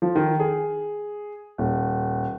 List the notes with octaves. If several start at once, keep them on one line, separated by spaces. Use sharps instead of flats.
F3
D#3
G#4
D#1